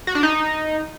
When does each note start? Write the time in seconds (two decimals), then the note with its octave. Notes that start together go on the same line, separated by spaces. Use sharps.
0.07 F#4
0.15 D4
0.23 D#4